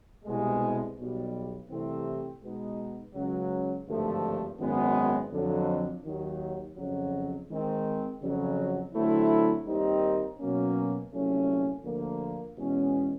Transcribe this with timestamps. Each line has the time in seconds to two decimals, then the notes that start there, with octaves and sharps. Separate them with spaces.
0.25 C2 B2 G#3
0.98 B1 B2 G3
1.70 C2 C3 E3 A3 C4
2.43 B2 G#3 B3 D#4
3.15 C#2 C#3 F#3
3.87 G#1 G2 D3 F3 A3
4.60 G#1 F#2 D#3 G#3 B3
5.32 F2 D3 F#3
6.04 D#2 D#3 F#3
6.77 F2 C#3 F#3
7.50 D#3 G#3 C4
8.21 F2 C#3 F#3
8.94 D3 F#3 A3 C4 E4
9.66 D#2 D#3 G3 C4 D#4
10.38 B2 F#3 A#3 C#4
11.12 C2 A#2 F#3 A3 C#4
11.84 D2 D3 F3 A#3
12.56 E2 B2 G#3 C#4